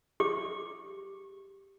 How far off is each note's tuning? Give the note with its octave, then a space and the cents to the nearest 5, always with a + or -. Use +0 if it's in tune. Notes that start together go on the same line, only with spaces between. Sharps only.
G4 +0 D6 +0